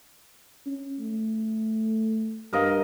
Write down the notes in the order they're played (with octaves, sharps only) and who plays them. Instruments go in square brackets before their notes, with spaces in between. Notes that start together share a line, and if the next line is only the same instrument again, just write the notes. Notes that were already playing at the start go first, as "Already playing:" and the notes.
[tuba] C#4
A3
[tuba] G2 [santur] A#4 D#5 F5